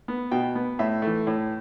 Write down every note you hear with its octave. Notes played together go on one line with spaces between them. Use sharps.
B3
B2 G5
B3
A2 E5
E3 A3
A2